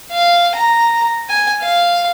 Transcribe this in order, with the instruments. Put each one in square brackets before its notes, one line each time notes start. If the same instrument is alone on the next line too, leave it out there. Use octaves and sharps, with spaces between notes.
[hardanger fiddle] F5
A#5
G#5
F5